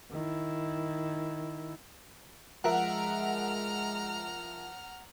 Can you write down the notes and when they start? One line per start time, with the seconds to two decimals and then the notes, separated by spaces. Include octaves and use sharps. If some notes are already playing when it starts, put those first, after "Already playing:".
0.11 D#3 E4
2.64 F3 G#3 A#4 E5 F#5 A#5 F6